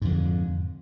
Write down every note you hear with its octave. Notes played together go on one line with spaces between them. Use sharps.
F2 G#2 D3